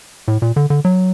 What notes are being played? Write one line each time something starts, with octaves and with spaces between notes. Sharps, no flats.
A2
A#2
D3
D3
F#3